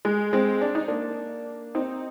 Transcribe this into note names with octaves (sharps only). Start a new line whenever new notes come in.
G#3
G#3 C4
D4
D#4
A#3 D4
C4 D#4